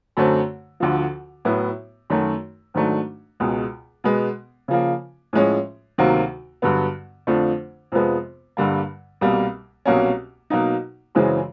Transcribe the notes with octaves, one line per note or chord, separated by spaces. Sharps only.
F#2 D3 F#3 A3 C4
D2 D3 F3
A2 F#3 B3 E4
F#2 D#3 F#3 A3
G#2 D#3 F#3 A3 D4
C#2 B2 G#3
B2 G#3 B3
C#3 F3 A#3
A2 F3 G#3 C#4
D2 C3 D#3 F#3 A#3
G2 D3 F#3 B3
F2 D3 F3 A3 D4
F2 C3 F3 G#3 B3
G2 D3 G3 A#3
C2 B2 G3 A#3
C2 B2 F#3 A#3 C#4
B2 F#3 A#3 D#4
F#2 C#3 E3 G#3 C4